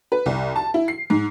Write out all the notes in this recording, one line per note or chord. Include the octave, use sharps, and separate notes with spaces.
B4
C2
A5
E4
C7
G#2